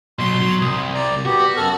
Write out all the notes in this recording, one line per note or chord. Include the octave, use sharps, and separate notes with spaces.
B2 F#3 C6
F#3
C2 D#6
D5 A#5
B3 F#4 G4
F#2 A4 F6